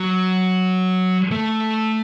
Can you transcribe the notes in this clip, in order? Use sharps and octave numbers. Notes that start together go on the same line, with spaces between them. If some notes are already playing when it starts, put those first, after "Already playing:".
Already playing: F#3
A3